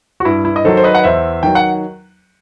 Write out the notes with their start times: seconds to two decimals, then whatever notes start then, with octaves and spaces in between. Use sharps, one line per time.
0.20 F#4
0.25 G2 E4
0.45 E4
0.56 D#5
0.64 D#3 F#3 A4 C5
0.77 C5
0.84 B4 D#5
0.95 F#5
1.04 E2 C5 E5
1.43 D#3 F#3 G5
1.55 F#5